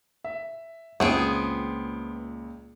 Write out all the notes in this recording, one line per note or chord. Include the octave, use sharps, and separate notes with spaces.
E5
C#2 A#2 B3 C4 G#4 G5